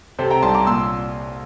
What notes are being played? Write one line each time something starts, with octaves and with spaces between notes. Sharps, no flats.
C3 A4 C5
G5 A#5
C2 A5 C6
A#5 D6
A#2 C6 E6